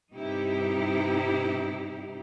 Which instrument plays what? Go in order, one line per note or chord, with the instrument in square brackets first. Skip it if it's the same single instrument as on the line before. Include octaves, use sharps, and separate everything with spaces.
[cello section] G2 C3 D#4 E4 G4